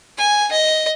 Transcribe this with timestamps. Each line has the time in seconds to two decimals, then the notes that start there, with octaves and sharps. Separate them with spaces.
0.18 G#5
0.52 D#5